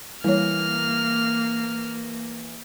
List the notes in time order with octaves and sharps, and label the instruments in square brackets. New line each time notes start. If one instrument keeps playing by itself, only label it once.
[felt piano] E3 [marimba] G3 C#5 [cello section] A#3 [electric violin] F6